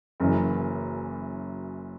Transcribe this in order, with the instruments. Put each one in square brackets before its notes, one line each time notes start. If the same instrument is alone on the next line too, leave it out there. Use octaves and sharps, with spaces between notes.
[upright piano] F#1 F#2 E3